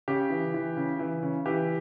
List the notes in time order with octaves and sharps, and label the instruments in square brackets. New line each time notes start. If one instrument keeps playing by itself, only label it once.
[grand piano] C#3 G4
E3
E3
C#3
E3
C#3
E3 G4